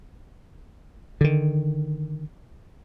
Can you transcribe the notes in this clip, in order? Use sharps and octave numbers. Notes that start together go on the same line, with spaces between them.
D3 D#3